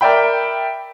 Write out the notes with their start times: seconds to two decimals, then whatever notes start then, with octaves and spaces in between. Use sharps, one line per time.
0.01 A#4 D5 E5 G5 B5